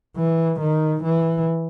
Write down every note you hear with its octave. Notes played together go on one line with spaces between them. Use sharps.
E3
D#3
E3